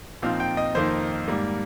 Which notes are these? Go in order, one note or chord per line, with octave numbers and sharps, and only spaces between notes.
A#2 F3 C4 D#4 F5
G5
D#5
F2 D#3 A#3 D#4 C5
G#2 G3 A#3